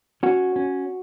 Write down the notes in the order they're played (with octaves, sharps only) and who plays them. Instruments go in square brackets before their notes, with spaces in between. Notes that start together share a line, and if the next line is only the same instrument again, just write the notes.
[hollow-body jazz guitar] C#4 F#4
C#4